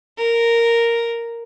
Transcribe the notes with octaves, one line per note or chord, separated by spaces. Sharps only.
A#4